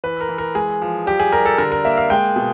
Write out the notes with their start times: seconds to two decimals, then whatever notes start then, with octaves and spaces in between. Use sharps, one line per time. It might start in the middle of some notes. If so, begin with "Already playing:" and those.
0.04 E3 B4
0.21 A#4
0.29 E3
0.38 A#4
0.55 G#3 G#4
0.82 F3
1.06 G3 G4
1.20 G#4
1.32 G3 A#4
1.46 A4
1.58 D3 A#4
1.72 A#4
1.85 A#3 E5
1.97 F5
2.10 G#3 G5
2.36 B2